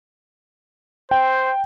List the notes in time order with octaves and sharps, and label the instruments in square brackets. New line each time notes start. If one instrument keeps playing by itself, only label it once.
[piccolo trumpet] C5 [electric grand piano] G5